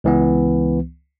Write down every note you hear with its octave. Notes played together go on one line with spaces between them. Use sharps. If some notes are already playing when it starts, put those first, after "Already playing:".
C#2 E3 B3